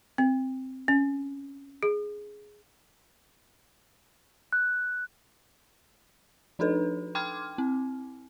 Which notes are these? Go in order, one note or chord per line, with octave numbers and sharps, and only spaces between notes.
C4
C#4
G#4
F#6
F3 D4 D#4 A4 B4
G5 C6 D6 F6 G#6
C4